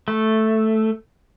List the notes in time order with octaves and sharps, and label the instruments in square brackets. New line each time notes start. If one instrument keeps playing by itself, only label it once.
[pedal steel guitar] A3